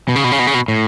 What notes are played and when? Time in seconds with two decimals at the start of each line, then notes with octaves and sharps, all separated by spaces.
0.08 B2
0.16 C#3
0.24 B2
0.32 C#3
0.39 B2
0.47 C#3
0.54 B2
0.68 A2